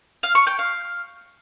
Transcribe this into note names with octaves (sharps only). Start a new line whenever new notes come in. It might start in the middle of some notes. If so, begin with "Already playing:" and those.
F5
C#6
G5
F5